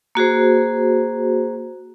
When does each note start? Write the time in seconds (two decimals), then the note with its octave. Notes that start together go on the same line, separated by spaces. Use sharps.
0.15 A#3 F#4 G#4 C5